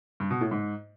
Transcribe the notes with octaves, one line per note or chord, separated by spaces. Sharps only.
G2
B2
A2
G#2